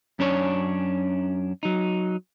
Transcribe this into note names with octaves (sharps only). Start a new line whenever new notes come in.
F#2 C#4 D4 A#4 C#5
F#3 D#4